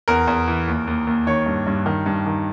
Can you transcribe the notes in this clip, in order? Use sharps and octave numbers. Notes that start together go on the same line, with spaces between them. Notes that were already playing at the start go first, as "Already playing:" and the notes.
E2 A#4
E2
E3
D#2
D#2
D#2
D#3 C#5
G2
G2
D#3
G2
D#3